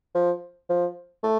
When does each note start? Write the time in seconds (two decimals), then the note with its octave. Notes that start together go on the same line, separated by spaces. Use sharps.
0.15 F3
0.69 F3
1.23 A3